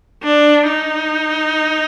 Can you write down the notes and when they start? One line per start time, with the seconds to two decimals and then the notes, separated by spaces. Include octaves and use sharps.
0.23 D4
0.68 D#4